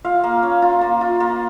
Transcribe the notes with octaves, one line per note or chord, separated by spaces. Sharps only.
F4 F5
A#3
C#4
F4
A#3
F4
A#3